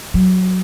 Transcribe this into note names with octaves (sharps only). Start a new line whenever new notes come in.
F#3